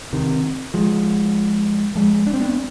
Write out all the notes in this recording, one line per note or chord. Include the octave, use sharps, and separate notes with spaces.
C3 D#3
F3 G#3
F3 G#3
D4
C4
B3 D4